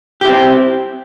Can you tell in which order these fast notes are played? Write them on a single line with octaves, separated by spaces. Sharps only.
G4 E4 C4